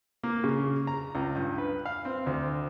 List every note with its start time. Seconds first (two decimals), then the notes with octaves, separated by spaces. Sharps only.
0.23 A#3
0.44 C#3
0.87 A#5
1.15 C#2
1.35 G2
1.58 B4
1.86 F5
2.05 C4
2.26 D2